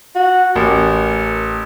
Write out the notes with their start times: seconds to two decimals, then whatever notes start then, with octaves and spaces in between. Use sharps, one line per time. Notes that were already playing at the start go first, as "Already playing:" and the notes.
0.15 F#4
0.56 A1 A#4